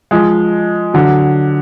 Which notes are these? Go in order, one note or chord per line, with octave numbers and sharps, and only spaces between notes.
F3 G#3
D3 F#3